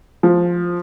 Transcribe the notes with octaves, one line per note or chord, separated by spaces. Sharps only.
F3